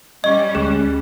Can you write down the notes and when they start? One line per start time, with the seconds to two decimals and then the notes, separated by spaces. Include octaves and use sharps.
0.24 G3 C#4 D#5 C#6
0.55 D2 G#3 G#4 F#6